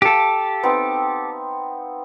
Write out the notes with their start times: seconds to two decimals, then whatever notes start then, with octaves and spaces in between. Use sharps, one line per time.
0.02 G4 A4 F5
0.63 B3 C4 D#4